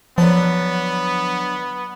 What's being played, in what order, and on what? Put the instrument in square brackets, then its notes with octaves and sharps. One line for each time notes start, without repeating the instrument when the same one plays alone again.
[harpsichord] D3 F#3 A5 [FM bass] F3 [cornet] B3